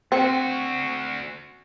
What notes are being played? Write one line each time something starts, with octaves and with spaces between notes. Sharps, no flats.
D2 C4 F#4